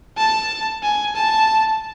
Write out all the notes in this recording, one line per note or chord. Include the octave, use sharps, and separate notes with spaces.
A5
G#5
A5